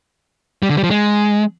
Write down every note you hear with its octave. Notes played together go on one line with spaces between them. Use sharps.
G3
D3
G3
F3
G#3